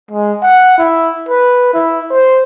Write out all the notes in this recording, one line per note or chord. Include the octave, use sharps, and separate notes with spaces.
G#3
F#5
E4
B4
E4
C5